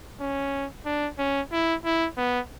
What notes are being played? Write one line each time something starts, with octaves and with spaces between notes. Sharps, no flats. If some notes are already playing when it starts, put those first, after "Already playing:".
C#4
D4
C#4
E4
E4
B3